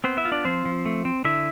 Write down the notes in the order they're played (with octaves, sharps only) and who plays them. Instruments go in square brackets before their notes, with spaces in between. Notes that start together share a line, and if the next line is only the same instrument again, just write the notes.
[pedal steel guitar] B3 C4 C5
E4 E5
F4
D4 D5
F3 C4 C5
F3
A3
C4
D3 E4 E5